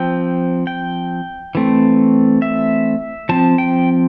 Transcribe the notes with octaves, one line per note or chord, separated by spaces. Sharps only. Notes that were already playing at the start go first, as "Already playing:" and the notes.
Already playing: F3 C4 G5
G5
E3 A3 C4
E5
F3 C4 A5
G5